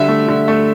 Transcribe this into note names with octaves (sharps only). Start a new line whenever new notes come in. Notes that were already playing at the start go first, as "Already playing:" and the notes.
Already playing: D3 G3 E5
A3
D3
A3